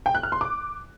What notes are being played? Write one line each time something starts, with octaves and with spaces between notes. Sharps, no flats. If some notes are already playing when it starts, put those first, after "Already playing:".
G5
F#6
F6
C6
D6